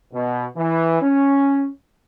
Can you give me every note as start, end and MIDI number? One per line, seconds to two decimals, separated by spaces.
0.13 0.45 47
0.56 1.00 52
1.01 1.67 61